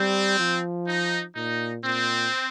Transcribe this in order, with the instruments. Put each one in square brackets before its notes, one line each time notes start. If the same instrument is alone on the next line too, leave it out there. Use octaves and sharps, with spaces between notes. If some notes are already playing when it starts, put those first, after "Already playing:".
Already playing: [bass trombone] G3 [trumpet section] C4
[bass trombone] F3
[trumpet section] D#4
[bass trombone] A#2 [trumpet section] D#4
[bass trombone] A#2 [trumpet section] C4